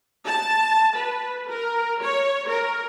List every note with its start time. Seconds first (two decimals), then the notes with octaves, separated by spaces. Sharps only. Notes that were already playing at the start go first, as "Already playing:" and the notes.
0.25 A5
0.97 B4
1.49 A#4
2.01 C#5
2.49 A#4